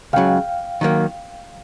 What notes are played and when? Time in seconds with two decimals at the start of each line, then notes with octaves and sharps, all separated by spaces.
0.13 C#2 C#3 F#3 F5 G5
0.81 D#3 F#3 A#3